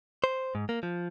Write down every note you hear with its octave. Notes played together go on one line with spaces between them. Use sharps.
C5
G#2
A#3
F3